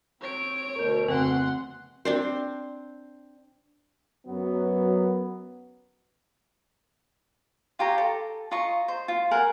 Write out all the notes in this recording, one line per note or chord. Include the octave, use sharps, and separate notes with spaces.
C4 C#5 D7
D2 B2 A#4 G6
F2 C#3 C4 F#5 C6
C4 D4 C5
F#2 F#3 B3
F4 G4 C#5 A#5
A4
F4 D#5 A#5 C#6
C5
F4
A#4 F#5 G#5